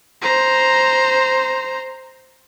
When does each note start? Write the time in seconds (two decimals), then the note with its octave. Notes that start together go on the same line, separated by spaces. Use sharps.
0.22 C5 A#5